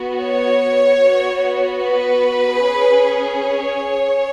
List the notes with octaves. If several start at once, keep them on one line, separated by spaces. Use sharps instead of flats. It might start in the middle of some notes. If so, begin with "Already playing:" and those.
Already playing: B3 F#4
C#5
B3 F#4
B4
C#4 G#4
C#5